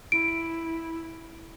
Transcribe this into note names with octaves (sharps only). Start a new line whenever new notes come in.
E4 D7